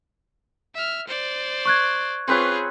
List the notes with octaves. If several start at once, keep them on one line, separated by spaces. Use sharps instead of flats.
E5 F6
C5 D5
C#6 F#6 G#6
C4 F4 G#4 B4 C#5